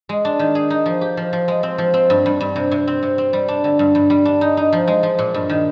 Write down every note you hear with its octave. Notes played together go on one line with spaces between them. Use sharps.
G#3
D4
D#3
G#4
D#4
F3
G4
F3
F3
G#3
C4
F3
C4
G2
G2
G2
C3
C3
C4
C3
C4
G3
D4
D3
G2
G2
G3
D4
D#4
D#4
F3
G#3
F3
A#2
G2
D#3